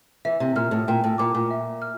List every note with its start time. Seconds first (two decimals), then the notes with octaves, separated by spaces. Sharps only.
0.25 E3 E5
0.40 C3
0.56 A#2 F6
0.71 A2
0.88 A#2 G5
1.04 A2
1.18 A#2 D6
1.35 A#2
1.51 E5
1.82 F6